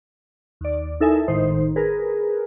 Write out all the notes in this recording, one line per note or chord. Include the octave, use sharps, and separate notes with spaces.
D#2 D5
D#4 E4 A4 A#4 E5 G#5
G#1 A2 D#3 D#4 C5
G#4 A#4 B4